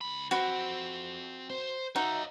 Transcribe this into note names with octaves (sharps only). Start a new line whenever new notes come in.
C#2 B5
F3 C4 F#4 B5
C5
D#4 F#4 C#5 D#5 E5